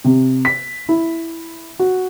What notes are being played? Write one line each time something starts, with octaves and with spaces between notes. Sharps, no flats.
C3
B6
E4
F#4